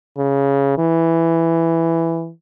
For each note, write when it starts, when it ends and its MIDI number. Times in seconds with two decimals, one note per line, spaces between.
0.18 0.77 49
0.78 2.30 52